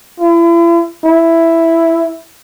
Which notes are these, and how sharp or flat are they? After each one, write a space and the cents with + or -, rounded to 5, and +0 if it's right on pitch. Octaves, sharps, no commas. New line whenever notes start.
E4 +40
E4 +5